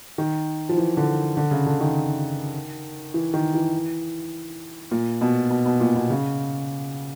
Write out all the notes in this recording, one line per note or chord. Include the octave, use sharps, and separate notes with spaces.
D#3
F3
E3
D3
D3
C#3
D3
D#3
E3
D#3
E3
A#2
B2
B2
B2
A#2
B2
C#3